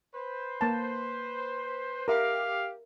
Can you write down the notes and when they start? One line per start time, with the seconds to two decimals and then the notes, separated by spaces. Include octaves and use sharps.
0.14 B4 C5
0.61 A#3 A5
2.08 G4 A#4 E5 F5